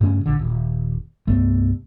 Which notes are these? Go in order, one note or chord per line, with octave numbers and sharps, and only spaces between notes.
G2 C#3 A3 C#4
A#1 D3
D#1
C2 G2 A3 B3